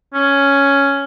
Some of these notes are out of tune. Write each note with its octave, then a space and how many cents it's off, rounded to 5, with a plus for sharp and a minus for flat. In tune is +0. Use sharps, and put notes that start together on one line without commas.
C#4 +5